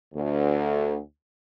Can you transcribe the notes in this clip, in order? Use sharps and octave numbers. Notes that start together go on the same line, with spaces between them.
D2